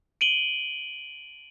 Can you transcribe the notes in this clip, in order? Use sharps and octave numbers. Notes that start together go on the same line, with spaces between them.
D7 D#7 F#7 G7